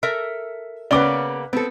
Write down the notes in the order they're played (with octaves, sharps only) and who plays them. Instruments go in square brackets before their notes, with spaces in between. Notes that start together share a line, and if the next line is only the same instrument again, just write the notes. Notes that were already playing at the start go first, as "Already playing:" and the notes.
[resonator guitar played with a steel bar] A4 A#4 E5
[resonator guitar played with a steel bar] C#3 A#3 B3 [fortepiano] C#4 D5 [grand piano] B4 D6 G7
[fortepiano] B3 [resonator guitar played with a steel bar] C4 A4